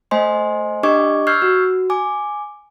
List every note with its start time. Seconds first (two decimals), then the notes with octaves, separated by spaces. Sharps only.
0.11 A3 C5 D#5 G#5 C6
0.83 D4 G4 D#5 C#6 D6 G#6
1.27 C#6 E6 F6 G6 G#6 C7
1.42 F#4
1.90 G#5 D6